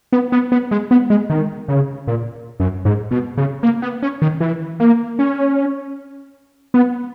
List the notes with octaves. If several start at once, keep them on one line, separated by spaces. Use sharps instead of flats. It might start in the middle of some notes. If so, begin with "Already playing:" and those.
B3
B3
B3
G#3
B3
G#3
D#3
C#3
A#2
F#2
G#2
B2
C#3
A#3
B3
C#4
D#3
E3
A#3
C#4
B3